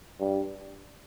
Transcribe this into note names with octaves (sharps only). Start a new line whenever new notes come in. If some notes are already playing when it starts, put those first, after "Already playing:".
G2